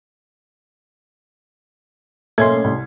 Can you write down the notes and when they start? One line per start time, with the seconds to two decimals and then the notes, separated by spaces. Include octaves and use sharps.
2.38 B1 A3 A#3 C#4 C6 G#6
2.64 C2